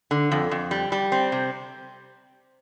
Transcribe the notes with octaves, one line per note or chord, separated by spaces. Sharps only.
D3
F2
F2
G3
G3
C4
C3